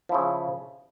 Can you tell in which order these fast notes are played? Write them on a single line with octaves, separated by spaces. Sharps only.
F3 E4 C#3